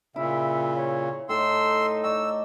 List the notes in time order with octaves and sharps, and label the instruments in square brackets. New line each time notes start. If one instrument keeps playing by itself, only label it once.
[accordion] A#2 C#3 [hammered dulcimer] E4 [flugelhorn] E5
[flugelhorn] C#5
[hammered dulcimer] A2 [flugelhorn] D#4 [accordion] C6 E6
[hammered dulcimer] D5 D#5 C#6 [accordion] E6